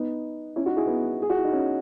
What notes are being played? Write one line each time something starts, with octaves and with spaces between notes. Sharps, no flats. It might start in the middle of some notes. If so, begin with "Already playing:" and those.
Already playing: B3 D#4
C#4 E4
D#4 F#4
E4 G#4
B3
G#4
F#4
E4
D#4
C#4